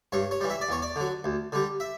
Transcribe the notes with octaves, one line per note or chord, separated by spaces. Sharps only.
G2 C#5
C#5
E3 G3
E5
D5
E2 C#5
D5
D3 F#3
D2
D3 G3
E5